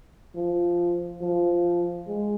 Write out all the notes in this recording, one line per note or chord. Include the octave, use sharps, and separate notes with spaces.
F3
F3
G#3